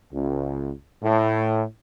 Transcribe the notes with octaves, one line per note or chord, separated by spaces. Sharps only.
C#2
A2